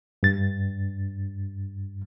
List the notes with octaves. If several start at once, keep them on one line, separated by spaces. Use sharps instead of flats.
G2 A6